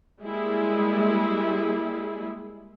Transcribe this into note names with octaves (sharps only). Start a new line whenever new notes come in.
G3 G#3 A#3 E4 G#4